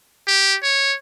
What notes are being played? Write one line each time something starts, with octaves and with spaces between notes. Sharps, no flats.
G4
C#5